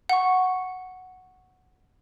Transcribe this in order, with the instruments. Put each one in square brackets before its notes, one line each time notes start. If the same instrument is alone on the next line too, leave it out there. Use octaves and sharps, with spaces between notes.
[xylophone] F#5 C#6